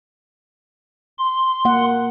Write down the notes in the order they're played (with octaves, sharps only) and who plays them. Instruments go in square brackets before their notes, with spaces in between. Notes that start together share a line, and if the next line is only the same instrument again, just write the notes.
[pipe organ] C6
[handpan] A#3 F#5